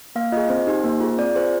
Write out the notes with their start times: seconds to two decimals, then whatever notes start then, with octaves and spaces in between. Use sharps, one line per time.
0.16 A#3 F5
0.32 F4 G#4 D#5
0.49 C4 C5
0.67 D#4 G4
0.84 A#3
1.01 F4 G#4
1.18 C4 D5
1.35 F4 G#4 C5